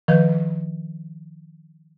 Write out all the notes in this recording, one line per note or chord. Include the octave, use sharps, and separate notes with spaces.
D#3 F3 B4 G6